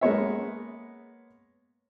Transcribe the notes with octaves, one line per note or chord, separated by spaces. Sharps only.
G#3 A#3 B3 C#5 E5